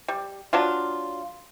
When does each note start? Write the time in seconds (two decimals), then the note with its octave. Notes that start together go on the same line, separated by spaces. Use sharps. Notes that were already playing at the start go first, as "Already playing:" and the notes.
0.08 G3
0.53 F#3 D4 F4